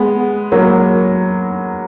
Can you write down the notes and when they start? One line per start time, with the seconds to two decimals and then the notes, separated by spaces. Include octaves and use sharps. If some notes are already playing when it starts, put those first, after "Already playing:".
Already playing: G#3 B3
0.52 F#3 A#3